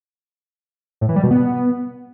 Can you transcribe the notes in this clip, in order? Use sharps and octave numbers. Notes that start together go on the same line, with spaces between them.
A2
E3
G3
B2
B3